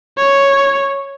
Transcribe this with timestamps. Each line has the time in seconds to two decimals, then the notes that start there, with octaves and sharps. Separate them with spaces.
0.17 C#5